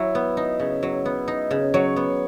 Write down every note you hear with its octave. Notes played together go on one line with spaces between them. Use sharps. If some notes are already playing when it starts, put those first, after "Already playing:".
Already playing: F#3 E4
B3
D#4
C#3
F#3
B3
D#4
C#3
F#3 C#5
B3